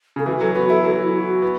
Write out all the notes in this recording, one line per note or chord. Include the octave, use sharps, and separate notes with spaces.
C#3 A4
E3 F#4
F#3 A4
B3 F#4
E4 A4
F#3 A4
F#4
E4
F#4
B3